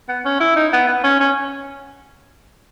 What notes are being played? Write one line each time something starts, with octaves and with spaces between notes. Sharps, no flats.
B3
C#4
E4
D#4
B3
B3
C#4
C#4